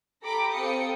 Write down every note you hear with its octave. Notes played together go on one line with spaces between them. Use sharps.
G4 A4 A#5 B5 D6
C4 A4 F5 G5 D#6 C#7